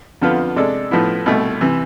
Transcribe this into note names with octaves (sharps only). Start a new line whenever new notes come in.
F2 D3 F3 B3 F4
C3 G#3 D4 A4
A2 F3 B3 E4
C2 B2 A3
C3 E3